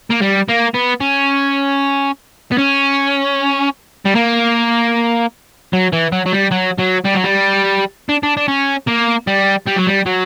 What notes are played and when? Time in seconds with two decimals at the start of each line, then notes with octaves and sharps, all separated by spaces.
0.11 A#3
0.22 G3
0.49 A#3
0.75 B3
1.01 C#4
2.52 B3
2.58 C#4
4.06 G3
4.15 A#3
5.73 F#3
5.93 E3
6.12 F#3
6.26 F#3
6.33 G3
6.51 F#3
6.78 F#3
7.05 G3
7.14 F#3
7.24 G3
8.09 D4
8.23 D4
8.37 D4
8.48 C#4
8.88 A#3
9.27 G3
9.67 G3
9.76 F#3
9.87 G3
10.06 F#3